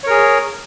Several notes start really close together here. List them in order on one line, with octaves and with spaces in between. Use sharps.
C#5 A#4 G#4